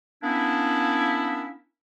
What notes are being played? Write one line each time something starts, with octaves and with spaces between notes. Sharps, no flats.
A#3 B3 C#4 D4 E4